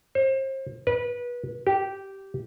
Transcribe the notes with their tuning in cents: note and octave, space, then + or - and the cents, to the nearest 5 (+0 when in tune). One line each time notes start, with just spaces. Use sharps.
C5 +35
B4 -25
G4 -10